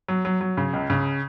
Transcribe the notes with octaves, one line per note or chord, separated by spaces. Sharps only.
F#3
F#3
F#3
C#3
C#2
C#3